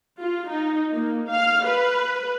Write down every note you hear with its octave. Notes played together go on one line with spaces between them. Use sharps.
F4
D#4
A#3
F5
B4